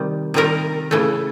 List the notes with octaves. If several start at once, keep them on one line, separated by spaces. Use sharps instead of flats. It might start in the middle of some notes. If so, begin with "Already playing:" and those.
Already playing: C3 D#3 G3
C3 D#3 G3 A#4
C#3 E3 A3